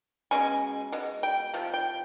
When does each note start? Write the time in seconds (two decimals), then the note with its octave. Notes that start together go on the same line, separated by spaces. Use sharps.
0.31 B2 G#3 C#4 G#5
0.92 B2 G#3
1.23 G5
1.54 C3 F3
1.74 G5